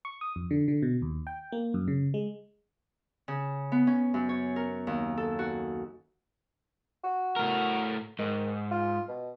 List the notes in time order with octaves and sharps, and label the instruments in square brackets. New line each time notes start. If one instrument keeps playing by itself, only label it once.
[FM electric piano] C#6
D#6
F2
D3
D3
B2
D#2
G5
A#3
F#2
C#3
G#3
[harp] C#3
B3
C#4
F#2
C#5
A#4
D#2
A4
F#4
[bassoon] F#4
[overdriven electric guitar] A2 A#4
[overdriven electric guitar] G#2 [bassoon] D#3
[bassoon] F4
B2